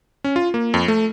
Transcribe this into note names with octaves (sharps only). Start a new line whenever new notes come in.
C#4
F4
A#3
F2
A3